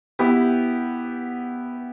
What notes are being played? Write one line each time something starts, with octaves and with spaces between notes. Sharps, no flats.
B3 E4 G4